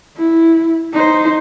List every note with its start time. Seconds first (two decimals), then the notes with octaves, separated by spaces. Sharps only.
0.17 E4
0.93 D#4 C5